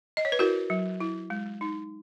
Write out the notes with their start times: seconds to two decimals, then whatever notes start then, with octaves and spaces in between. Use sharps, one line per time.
0.17 D#5
0.25 C#5
0.32 B4
0.39 E4 F#4 A#4
0.70 F#3
1.00 E4
1.30 G#3
1.61 D#4